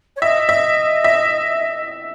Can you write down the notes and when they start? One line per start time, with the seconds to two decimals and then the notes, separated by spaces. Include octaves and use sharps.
0.16 C#5
0.22 D#5 E5
0.49 E5
1.04 E5